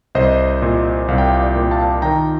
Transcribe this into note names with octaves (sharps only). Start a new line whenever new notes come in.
C2 C5 D#5
A#2
C2 F5
G5
D5 F5
A#2
F5 A5
D#3 G5 A#5